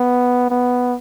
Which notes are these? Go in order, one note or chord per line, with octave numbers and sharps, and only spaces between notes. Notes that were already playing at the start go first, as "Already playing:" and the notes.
Already playing: B3
B3